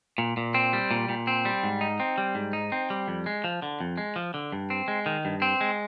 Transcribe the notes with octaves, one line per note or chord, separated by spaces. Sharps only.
A#2
A#2
C4
G3
A#2
A#2
C4
G3
G#2
D#4
C4
G3
G#2
D#4
C4
G3
F2
G#3
F3
D3
F2
G#3
F3
D3
G2
C4
G#3
D#3
G2
C4
G#3